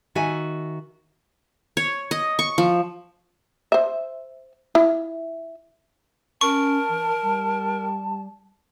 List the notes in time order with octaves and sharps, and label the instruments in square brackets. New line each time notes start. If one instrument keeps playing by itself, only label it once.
[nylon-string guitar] D#3 F#4 E5 G#5
[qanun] C#5
D#5
C#6
F3
[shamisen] C5 E5
E4
[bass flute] C#4 [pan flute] A#4 [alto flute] A5 [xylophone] C#6
[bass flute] E3
G3